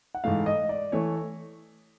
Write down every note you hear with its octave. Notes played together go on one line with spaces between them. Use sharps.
F#5
G#2 E3 A3 F5
D#5
D5
E3 A3 C#5